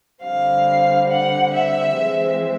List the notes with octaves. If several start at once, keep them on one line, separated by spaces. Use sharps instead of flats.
D3 G3 C4 F5
F#5
E5
E3 G#3 C4